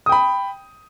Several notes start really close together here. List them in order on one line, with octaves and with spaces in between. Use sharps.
D#6 G5 B5